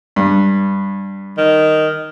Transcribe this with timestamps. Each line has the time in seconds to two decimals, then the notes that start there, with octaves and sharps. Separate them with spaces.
0.16 G2
1.38 D#3